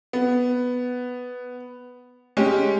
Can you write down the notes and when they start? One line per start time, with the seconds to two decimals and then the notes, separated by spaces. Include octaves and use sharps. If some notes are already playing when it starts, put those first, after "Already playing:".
0.13 B3
2.37 G#3 C#4 G4